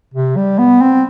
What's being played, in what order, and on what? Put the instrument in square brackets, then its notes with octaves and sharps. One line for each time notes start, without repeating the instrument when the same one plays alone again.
[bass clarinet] C3
G3
B3
C4